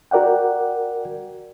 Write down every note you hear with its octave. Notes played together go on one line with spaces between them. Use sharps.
F#4 A#4 D5 F#5 G5